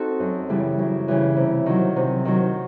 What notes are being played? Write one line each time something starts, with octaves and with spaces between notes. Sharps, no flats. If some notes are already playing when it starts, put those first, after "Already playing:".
Already playing: C4 D#4 F#4 A4
F#2
C#3 E3 G3
F#2
C#3 E3 G3
C3
D#3 F#3
C3
D#3 F#3